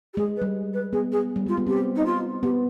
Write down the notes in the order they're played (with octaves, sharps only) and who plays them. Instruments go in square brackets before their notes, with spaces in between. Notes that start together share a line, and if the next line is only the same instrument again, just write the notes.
[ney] G4
[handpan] G#3 [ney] G#4
[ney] B4
[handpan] G3
[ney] B4
[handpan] B3 [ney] G#4
[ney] G#4
[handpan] G3
[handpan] G#3 [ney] F4
[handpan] B3
[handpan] C4 [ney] G4
[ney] D#4
F4
[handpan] B3 [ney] G4